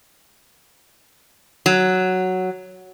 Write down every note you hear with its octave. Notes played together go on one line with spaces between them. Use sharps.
F#3